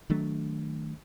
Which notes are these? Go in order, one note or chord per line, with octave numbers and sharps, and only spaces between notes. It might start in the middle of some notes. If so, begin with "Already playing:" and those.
D#3 F#3 A3 D4